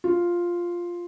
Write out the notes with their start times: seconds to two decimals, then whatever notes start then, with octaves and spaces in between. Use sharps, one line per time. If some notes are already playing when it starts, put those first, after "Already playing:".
0.04 F4